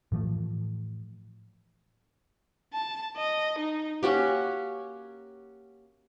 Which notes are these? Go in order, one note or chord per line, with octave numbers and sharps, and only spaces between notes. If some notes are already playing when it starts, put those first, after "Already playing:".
A2 E3 F3 A3
A5
D#5
D#4
A#3 C#4 F#4 G4